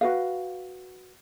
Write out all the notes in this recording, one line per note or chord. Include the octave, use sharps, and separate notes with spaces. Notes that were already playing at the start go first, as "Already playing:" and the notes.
F#4 B4 F5